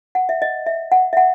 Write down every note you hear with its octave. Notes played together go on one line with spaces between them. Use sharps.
F#5
E5
D#5
E5
F#5
E5
F#5